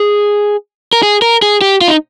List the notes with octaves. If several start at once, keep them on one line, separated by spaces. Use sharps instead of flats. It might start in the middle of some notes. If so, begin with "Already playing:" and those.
Already playing: G#4
A#4
G#4
A#4
G#4
G4
F4
D#4